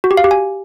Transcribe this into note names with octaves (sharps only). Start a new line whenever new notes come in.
F#4
G4
F5
G4
G#5